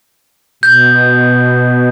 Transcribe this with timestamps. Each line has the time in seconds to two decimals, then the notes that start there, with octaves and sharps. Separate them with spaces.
0.63 B2 G6